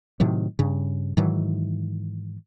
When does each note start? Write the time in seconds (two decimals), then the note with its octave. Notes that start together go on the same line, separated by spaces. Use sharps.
0.20 A2 C3 D#3 F#3
0.59 G2 C#3
1.17 G#2 D#3 E3 F#3